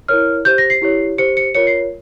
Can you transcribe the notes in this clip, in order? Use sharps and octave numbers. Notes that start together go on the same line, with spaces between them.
E4 A#4 C#5 F6
G4 C5 G6
A#6
C7
E4 G4 C#5
G4 C5 C#7
C#7
F4 A#4 C#5 C#7
C7